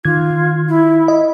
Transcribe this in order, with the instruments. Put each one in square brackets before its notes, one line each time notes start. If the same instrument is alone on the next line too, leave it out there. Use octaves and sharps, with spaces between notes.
[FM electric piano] D#3 G#6 [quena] F4
[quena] E4
[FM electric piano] D#5